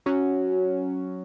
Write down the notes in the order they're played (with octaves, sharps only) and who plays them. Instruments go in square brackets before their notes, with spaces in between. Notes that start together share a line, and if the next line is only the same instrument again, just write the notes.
[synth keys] F#3 C#4 F#4